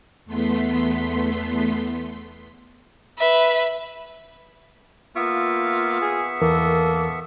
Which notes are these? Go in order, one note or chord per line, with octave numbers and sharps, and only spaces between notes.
E2 A3 B3 C6 B6
B4 E5
A#3 B3 F4 E5 C#6
G#4
E2 E3 A#3 A4 A#4